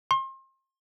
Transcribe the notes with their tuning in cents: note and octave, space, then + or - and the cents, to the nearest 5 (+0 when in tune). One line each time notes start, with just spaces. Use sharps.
C6 +35